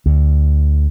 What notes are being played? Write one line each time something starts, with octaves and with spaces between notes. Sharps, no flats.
D2